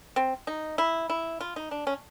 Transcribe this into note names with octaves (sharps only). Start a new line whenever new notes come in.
C4
D#4
E4
E4
F4
D#4
D4
C#4